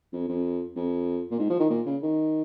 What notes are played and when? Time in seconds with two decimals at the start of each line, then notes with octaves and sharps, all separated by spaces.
0.13 F2
0.29 F2
0.76 F2
1.31 A#2
1.39 G#2
1.50 F3
1.60 D#3
1.70 A#2
1.86 C#3
2.03 D#3